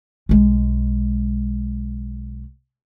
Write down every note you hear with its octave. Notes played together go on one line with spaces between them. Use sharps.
B1 G#3